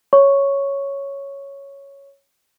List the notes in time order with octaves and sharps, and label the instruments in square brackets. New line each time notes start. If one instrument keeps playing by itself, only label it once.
[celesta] C#5 C#6